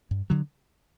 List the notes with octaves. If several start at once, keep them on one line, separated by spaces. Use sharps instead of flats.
G2
D3 F#3